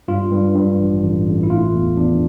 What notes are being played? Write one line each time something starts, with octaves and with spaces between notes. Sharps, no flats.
G2 F4
G2
G2
A1
A1
A1
E4
A3 F4
E2
E2 D4